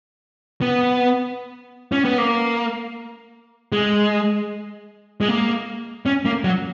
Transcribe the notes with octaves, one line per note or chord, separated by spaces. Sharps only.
B3
C#4
B3
A#3
G#3
G#3
A#3
C#4
A#3
F#3